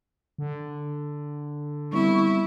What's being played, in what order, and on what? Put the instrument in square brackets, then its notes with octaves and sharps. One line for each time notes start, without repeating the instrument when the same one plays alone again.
[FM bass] D3
[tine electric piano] G3 B3 C4 [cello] E4 [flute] C#6